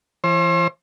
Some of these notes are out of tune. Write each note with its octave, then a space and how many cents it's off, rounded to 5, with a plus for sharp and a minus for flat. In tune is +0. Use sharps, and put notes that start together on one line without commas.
E3 +40 C5 +40